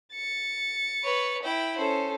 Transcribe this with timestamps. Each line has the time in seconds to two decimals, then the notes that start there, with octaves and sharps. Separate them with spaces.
0.15 A6 C#7
1.03 B4 C#5
1.43 E4 G5
1.77 C#4 A4 C5